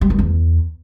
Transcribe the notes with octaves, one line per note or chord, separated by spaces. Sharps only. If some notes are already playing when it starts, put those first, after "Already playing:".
G3
D#3
E2